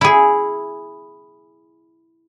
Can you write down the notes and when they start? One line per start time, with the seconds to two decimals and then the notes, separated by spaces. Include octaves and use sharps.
0.01 E4 G#4